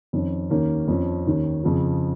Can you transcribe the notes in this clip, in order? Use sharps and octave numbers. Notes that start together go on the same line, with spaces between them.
F2 D#3 C#4
D#2 D#3 A#3 C#4
F2 F3 C#4
D#2 D#3 C#4
F2 C#3 F3